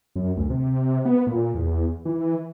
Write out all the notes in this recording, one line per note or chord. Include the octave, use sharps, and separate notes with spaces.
F#2
D2
C3
B3
A#2
E2
E3